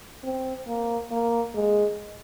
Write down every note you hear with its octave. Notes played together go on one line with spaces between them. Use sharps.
C4
A#3
A#3
G#3